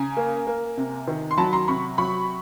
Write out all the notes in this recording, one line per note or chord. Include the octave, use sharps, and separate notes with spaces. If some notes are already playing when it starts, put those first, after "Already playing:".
Already playing: C#3 G#5 A#5
A#3
A#3
C3
D#3
C6
F#3 A5 B5
A#5 C6
C3 B5 C#6
F#3 B5 C#6